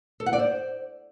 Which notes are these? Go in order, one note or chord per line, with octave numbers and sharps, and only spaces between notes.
A4
F#5
D5
C5